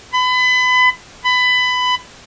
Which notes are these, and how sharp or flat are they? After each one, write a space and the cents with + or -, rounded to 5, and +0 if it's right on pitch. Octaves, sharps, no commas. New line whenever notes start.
B5 +30
B5 +20